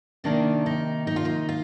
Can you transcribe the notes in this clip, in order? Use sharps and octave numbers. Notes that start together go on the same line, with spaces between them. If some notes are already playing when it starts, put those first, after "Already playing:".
C3 D#3 A#3 D4
D#4
D#4
F4
D#4
F4